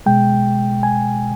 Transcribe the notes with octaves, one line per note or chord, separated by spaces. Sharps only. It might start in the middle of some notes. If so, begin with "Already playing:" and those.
B2 G#3 G5
G#5